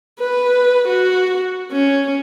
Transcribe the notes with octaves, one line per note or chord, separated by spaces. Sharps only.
B4
F#4
C#4